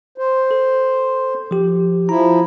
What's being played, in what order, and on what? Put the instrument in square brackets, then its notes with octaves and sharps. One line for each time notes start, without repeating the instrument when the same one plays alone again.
[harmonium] C5
[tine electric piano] A4
F3 G4
[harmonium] F3 E4 [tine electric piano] A#5